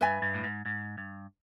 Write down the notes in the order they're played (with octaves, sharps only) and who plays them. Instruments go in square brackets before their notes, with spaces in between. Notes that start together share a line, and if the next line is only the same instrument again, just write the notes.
[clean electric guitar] G2 [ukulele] B4 E5 G#5 B5
[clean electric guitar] G2
A2
G#2
G#2
G2